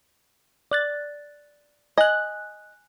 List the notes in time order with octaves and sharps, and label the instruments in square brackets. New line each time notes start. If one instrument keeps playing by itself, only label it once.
[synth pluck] D5 F#6 A6
[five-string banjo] D#5 [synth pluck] G#5 F#6